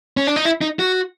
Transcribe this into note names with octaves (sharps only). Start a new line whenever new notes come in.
C#4
D4
D#4
E4
D#4
F#4